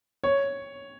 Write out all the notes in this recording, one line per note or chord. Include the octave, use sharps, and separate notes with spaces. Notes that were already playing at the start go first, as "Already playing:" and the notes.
C#5